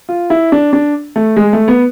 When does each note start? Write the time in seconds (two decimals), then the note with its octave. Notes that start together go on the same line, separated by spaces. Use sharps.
0.09 F4
0.30 E4
0.52 D4
0.73 D4
1.16 A3
1.37 G#3
1.53 A3
1.68 B3